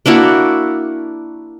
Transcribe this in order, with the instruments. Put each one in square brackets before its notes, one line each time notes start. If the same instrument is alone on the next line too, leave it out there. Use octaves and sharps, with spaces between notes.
[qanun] A#3 D4 E4 F#4